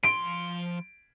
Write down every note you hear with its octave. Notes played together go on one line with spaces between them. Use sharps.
F3 C6 D7